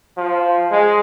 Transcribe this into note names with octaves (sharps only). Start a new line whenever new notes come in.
F3
G#3